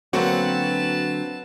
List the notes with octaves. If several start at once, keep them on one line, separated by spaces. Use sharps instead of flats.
D3 F#3 A#3 C4 F#4 B4 A5